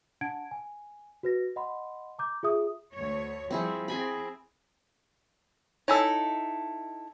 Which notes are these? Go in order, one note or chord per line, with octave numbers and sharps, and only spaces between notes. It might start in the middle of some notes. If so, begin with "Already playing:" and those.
D4 F#5 A5 G#6 D7
G#5
F#4 B4 A#6
D#5 F#5 B5 C6
A#5 D6 G6
F4 G#4 E5 D#6
D2 C#5
F3 G3 C4 E4 G#4
C4 G#4 G#5 B5
D#4 E4 A4 C#5 G#5 E6